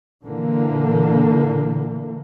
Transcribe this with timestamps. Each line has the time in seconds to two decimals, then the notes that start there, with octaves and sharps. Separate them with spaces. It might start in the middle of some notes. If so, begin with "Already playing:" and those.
0.22 A#2 D3 E3 A#3